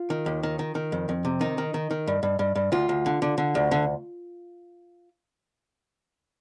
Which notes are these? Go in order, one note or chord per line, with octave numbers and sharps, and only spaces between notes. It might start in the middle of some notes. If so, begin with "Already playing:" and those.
Already playing: F4
D#3
D#2
D#3
D#3
D#3
F2
F2
C3
D#3 D#4
D#3
D#3
D#3
G2
G2
G2
G2
D2 F4
D2
D3
D3
D3
D2
D3